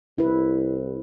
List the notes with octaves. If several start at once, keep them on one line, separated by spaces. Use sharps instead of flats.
C2 E4 B4